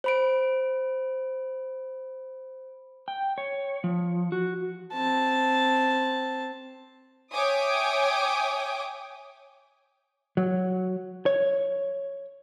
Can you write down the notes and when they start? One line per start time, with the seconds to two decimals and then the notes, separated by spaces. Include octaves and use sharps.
0.04 C5 B5 D7
3.08 G5
3.38 C#5
3.84 F3
4.32 F#4
4.94 C4 A5
7.32 C#5 E5 G5 G#5 D6 D#6
10.37 F#3
11.26 C#5